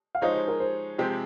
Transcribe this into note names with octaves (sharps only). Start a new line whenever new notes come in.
F5
F3 G#3 D#4 G#4 C5 C#5 D#5
C5
A#4
C5
C3 F3 G#3 C4 G4